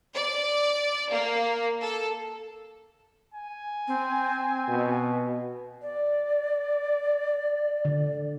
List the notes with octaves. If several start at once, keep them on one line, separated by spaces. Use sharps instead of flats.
D5
A#3
A4
G#5
C4
B2
D5
D3